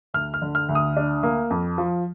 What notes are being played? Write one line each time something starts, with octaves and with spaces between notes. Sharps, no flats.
D2 F6
F6
D3
F6
D2
D#6
D4
A#3
F2
F3